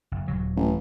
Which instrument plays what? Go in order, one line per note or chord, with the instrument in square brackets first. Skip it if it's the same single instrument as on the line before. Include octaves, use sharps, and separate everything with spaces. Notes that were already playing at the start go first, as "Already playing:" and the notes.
[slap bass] F#1
D#1 F#3
[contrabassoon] A1